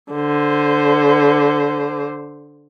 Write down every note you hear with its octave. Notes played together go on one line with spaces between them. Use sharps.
D3 C5